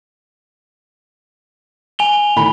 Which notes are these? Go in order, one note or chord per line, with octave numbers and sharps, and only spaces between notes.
G#5 F7 G7
A2 D#3 B5